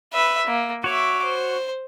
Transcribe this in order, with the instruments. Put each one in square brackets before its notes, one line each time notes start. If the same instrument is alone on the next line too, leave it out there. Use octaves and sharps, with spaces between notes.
[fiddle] B4 E5
A#3
[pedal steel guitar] F#4 C#5 [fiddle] E5 D6
[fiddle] C5